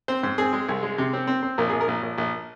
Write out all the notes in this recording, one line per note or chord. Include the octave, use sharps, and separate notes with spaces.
C4 C5
G#2 C5
C4 G#4
G#3
C2
G#3
C3
C4
C4
C4
A#1 A#4
A#1 G#4
A#4
A#1
A#1
A#1